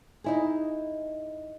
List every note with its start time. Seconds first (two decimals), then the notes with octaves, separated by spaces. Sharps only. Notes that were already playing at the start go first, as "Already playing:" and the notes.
0.24 D#4 E4 G#4